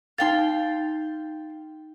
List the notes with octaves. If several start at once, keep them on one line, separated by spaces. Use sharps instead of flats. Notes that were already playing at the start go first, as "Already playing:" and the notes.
D#4 F5 G5 C6 A6